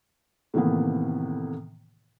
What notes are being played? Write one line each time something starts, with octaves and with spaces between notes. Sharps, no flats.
A2 C3 D#3 E3 A#3 B3